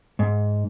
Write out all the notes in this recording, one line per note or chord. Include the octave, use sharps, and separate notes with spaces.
G#2